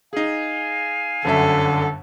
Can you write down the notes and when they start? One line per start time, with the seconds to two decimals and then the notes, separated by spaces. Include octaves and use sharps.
0.13 D#4 G#4 F5 G#5
1.25 G1 F#2 D3 A4 E5